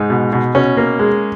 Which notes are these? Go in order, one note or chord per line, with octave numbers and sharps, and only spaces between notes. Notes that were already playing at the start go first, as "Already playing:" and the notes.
Already playing: G#2 D#4
B2
B2
B2 C#4
A#3
G#3